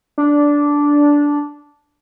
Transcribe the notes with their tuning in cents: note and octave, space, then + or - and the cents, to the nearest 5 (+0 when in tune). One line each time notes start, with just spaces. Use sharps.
D4 -10